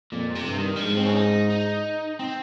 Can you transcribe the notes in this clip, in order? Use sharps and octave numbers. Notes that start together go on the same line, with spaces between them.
F2 A#2
A#2
C3
G2
D#3
G3
G#2 F3
C4
C#4
D#4
D#4
C4